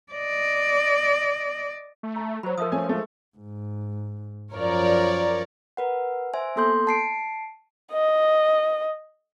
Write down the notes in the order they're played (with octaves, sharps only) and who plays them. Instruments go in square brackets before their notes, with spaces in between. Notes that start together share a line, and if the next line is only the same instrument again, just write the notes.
[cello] D5 D#5
[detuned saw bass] A3
[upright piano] A#5
[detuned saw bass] F#3 [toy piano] C5 B5
[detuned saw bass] F3 [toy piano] A#4 E5 D#6
[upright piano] A3 C#4 G#5
G#3 A3
[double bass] G#2
[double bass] F#2 F3 [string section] A#4 C#5 D5
[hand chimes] A#4 B4 F#5
C5 E5 G#5
A#3 B3 A4 C6 G6
A5 C7 D7
[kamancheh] D#5